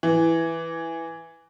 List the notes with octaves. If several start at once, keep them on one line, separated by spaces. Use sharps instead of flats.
E3